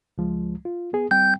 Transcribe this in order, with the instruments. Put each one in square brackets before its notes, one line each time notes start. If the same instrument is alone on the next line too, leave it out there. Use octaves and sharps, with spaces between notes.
[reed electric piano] C#2 F3 G#3
F4
B3 G#4
[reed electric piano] G3 C4 G5 [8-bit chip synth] G6